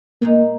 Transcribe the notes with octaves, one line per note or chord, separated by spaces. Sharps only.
A#2 G#3 A#3 D#4